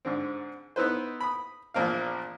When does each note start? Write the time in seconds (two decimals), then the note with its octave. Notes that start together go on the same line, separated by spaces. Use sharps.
0.05 G#2 D3 C4
0.76 B3 D#4 E4 B4 C5
1.21 B5 D#6
1.74 A#1 E2 A#2 A#3 C4 F5